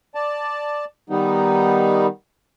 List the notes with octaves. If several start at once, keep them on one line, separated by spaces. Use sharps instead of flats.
D5 A5
D#3 G3 B3 D#4